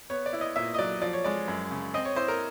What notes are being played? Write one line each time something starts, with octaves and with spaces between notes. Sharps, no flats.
B3 C#5
D5
E4
D#5
A#2 E5
D#5
F#3 D5
F3 D5
C#5
G#3 D5
F#2
C#3
C4 D#5
C#5
E4 C5
A#4